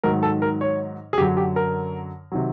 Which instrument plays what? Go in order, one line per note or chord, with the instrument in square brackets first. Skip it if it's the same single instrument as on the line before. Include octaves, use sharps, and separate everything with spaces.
[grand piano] G#2 D#3 F#3 A#4
A4
A#4
C#5
G#4
F#2 D3 F#3 G4
G4
A#4
C3 D#3 F#3